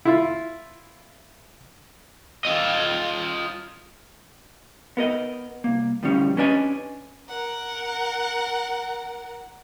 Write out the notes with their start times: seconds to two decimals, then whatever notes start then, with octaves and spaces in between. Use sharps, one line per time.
0.05 E4 F4
2.45 F4 D#5
4.97 B3 A#4 D#5
5.64 C2 A#3
6.03 A2 D3 F3 G3 C#4
6.37 C#4 D4 B4 D5 D#5 G#5
7.29 A#4 F#5